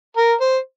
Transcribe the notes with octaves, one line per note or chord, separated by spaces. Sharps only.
A#4
C5